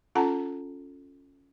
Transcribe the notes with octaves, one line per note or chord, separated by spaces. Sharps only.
C#4 F4 A4 F#5 A5 A#5